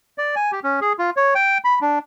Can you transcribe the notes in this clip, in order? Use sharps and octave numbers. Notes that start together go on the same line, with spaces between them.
D5
G#5
G4
C#4
G#4
F4
C#5
G5
B5
D4